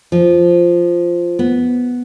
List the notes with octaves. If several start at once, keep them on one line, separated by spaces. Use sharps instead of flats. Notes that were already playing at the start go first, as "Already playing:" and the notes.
F3
B3